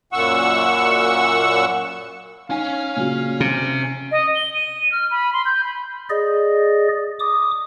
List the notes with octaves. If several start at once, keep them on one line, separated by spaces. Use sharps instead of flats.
F#2 A#2 F#5 C#6 E6
C#4 D#4 F5 G#5
A#2 C#3 F#3
C3 D#7
D#5
G7
D#7
F6
B5
C6
G6
B5
G#4 D5 D#5
D6 D#6